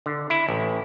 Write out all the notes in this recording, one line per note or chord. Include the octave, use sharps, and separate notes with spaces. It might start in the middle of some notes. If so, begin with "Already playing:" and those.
D3
E4
A1